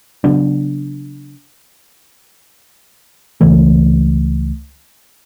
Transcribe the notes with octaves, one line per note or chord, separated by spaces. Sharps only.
C#3 F#3 B3 D4
C#2 C#3 E3 A3